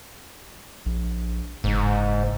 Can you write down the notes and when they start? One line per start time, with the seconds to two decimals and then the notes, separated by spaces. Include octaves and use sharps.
0.86 A#1
1.64 F#1 G#2